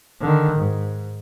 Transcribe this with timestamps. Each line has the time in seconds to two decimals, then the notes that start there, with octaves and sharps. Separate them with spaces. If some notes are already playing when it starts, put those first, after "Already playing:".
0.21 D3 D#3
0.59 G#2